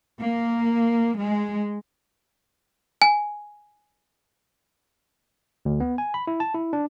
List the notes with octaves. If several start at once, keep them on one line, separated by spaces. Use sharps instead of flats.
A#3
G#3
G#5
D2
B3
G#5
B5
E4
A5
E4
D4